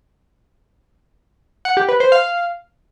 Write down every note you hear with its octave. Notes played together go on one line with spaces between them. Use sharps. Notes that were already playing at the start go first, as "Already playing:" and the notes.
F#5
G4
B4
C5
F5